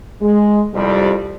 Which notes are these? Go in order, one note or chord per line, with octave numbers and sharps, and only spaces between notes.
G#3
C2 F2 C3 G3